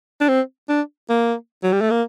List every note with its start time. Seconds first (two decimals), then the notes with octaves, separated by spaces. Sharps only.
0.21 D4
0.29 C4
0.69 D4
1.10 A#3
1.63 F#3
1.73 G3
1.81 A3
1.91 A#3